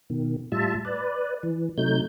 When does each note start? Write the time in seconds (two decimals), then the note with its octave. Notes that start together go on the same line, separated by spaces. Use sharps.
0.10 B2 D#3
0.52 A2 G3 F4 E5 A5
0.85 B4 D5
1.43 E3
1.78 C3 F#3 A3 D#4 G6